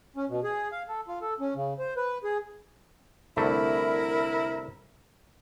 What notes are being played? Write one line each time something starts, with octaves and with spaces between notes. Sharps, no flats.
C#4
B2
G#4
F5
A4
F4
A4
C#4
C#3
C5
B4
G#4
C2 D3 A3 E4 A#4